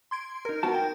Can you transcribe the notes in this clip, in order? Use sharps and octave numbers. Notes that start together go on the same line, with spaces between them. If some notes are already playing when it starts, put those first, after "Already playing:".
C6 G#6 D7
D#4 A#4
B3 F#4 A5
G5